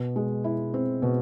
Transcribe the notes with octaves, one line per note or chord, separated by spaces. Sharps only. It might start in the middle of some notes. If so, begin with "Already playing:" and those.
Already playing: B2
G#3
E4
C4
B2